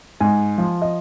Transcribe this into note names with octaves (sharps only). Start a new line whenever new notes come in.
G#2 G#5
F3
D#5